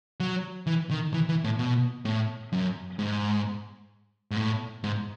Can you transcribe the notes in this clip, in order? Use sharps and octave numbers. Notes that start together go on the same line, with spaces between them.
F#3
E3
D#3
E3
E3
A2
B2
A2
F#2
G#2
G#2
A2
G#2